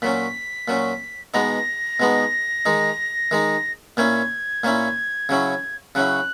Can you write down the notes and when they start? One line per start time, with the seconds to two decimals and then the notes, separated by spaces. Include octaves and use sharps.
0.02 A#2 F#3 C#4 B6
0.68 A#2 F#3 C#4
1.34 B2 G#3 B3 D#4 A#6
2.00 B2 G#3 B3 D#4
2.66 D#3 G#3 D#4
3.31 D#3 G#3 D#4
3.97 A#2 A#3 C#4 E4 G#6
4.64 A#2 A#3 C#4 E4
5.29 C#3 F#3 C#4 E4
5.95 C#3 F#3 C#4 E4 F#6